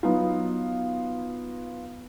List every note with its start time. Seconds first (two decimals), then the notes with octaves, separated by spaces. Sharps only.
0.03 F#3 B3 D#4 F4